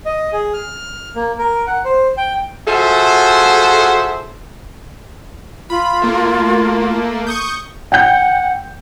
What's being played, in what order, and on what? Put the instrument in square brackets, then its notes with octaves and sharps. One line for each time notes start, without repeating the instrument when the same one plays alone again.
[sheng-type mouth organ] D#5
G#4
F6
A#3
A#4
F#5
C5
G5
[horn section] F4 F#4 G#4 A4 C5 E5
[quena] F4 [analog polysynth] B5
[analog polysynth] A3 A#3
C#6 D#6 G6
[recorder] F#5 [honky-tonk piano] G5 G6